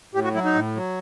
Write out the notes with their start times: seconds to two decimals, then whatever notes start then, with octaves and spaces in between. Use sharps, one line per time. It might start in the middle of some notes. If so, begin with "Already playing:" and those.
0.14 A2 G4
0.24 F#4
0.34 F#3 E4
0.45 D#4
0.54 A2
0.75 F#3